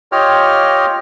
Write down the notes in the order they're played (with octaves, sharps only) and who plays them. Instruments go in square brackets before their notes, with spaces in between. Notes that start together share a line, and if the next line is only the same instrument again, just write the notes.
[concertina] F4 G4 C#5 D#5 G5 F6